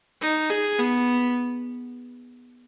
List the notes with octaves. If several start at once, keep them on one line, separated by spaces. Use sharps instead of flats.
D#4
G#4
B3